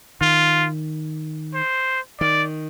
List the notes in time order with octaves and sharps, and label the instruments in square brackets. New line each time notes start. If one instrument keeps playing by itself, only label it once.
[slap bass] D#3 [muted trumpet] F4
[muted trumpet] C5
[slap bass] D#3 [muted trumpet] D5